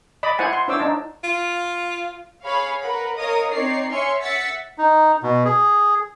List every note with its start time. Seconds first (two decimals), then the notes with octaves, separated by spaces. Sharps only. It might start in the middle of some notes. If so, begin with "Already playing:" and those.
0.23 D5 D#5 B5
0.39 E4 C5 F#5 G#5
0.53 C6
0.68 D4 E4 C5 C#5 D6 E6
0.79 D4 D#4 A5
1.24 F4
2.44 G#4 C#5 F5 B5
2.81 A#4 B4 F#5 B5
3.16 A#4 C#5 D#5 F5 D#6
3.51 C4 D#4 C#5 D5 C7
3.91 C#5 E5 G#5 C6 F6 C#7
4.21 E5 F#5 A6 B6 C#7
4.78 D#4
5.23 B2
5.45 G#4